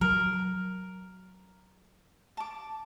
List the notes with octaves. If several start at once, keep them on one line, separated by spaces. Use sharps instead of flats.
F#3 A#4
A5 D6